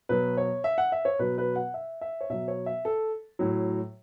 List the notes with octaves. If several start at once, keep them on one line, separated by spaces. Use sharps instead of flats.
B2 F#3 B4
C#5
E5
F#5
E5
C#5
B2 F#3 B4
B4
F#5
E5
E5
C#5
B2 F#3 E5
C#5
E5
A4
A2 F#3